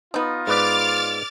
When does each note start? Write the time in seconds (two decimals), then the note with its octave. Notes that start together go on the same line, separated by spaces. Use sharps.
0.14 B3 D#4 F4
0.47 G#2 B4 D5 D6 F6 A6